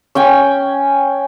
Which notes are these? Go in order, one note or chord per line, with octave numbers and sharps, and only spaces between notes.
C#4 G5 G#5